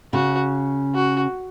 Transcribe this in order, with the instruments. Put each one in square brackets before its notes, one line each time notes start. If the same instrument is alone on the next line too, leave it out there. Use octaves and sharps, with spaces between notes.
[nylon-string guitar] C#3 [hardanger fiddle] F#4
[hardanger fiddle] F#4